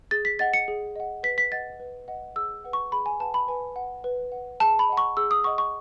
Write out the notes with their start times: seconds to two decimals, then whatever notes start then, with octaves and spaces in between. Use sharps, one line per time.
0.11 G#4 A6
0.25 B6
0.39 D#5 F#5 A6
0.54 C#7
0.68 G#4
0.96 D#5 F#5
1.23 B4 B6
1.38 B6
1.52 D#5 F#5 A6
1.80 B4
2.08 D#5 F#5
2.36 G#4 E6
2.64 B4 F#5
2.73 C#6
2.92 G#4 B5
3.06 G#5
3.20 B4 F#5 A5
3.34 B5
3.48 B4 G#5
3.76 F#5
4.04 B4
4.32 F#5
4.60 G#4 A5
4.79 B5
4.89 D#5 F#5
4.97 C#6
5.17 G#4 E6
5.31 D#6
5.44 D#5 F#5 C#6
5.58 C#6